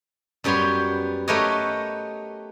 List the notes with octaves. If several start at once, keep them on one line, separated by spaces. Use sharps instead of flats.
F#2 G3 B3 G4 C#5 C6
A3 G4 A#4 B4 C#5 D#5